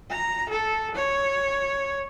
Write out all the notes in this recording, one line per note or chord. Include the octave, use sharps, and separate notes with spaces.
A#5
A4
C#5